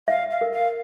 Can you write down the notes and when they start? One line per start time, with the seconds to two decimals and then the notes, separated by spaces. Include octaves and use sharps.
0.08 E5 F5
0.31 F5
0.41 A#4
0.52 F5